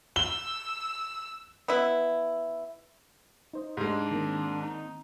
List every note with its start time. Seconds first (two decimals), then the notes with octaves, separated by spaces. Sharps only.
0.16 E6 G7
1.68 B3 E4
3.53 D#4 C5 D#5
3.77 G#2 G#3 D4
4.11 D#3 A#3 C4
4.62 D#4